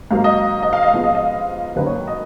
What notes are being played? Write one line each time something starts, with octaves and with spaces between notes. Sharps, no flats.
G#2 F#3 A#3 F5
D#5
D#5
F5
D#5
G#2 F3 G#3 B3 F5
D#5
D#5
F#2 D#3 F#3 A#3 B4
C#5
D#5